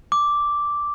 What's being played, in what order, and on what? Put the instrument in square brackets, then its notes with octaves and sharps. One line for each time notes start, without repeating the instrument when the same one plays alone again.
[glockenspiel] D6